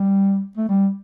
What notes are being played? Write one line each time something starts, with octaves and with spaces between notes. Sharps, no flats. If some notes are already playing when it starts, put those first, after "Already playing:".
Already playing: G3
A3
G3